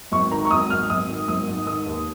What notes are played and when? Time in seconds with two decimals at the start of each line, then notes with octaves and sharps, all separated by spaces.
0.11 G#1 C#6
0.31 D#3 A#5
0.45 C#6
0.51 G#1 D#6
0.70 G#2 F6
0.90 G#1 D#6
1.09 D#3
1.28 G#1 D#6
1.48 G#2
1.67 D#3 D#6
1.86 D#2